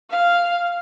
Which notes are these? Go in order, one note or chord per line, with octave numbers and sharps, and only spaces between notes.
F5